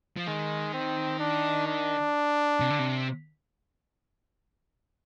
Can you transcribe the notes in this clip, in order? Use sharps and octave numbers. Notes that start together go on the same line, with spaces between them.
F3
D#3 G#3
C4
D4
D4
C3
D3
C3